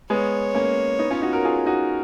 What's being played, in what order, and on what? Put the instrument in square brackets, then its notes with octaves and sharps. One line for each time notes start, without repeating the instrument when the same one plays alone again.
[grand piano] G#3 B3 [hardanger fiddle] C#5
[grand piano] A#3 C#4
B3 D#4
C#4 F4
D#4 F#4
F#4 A#4
F4 G#4
D#4 F#4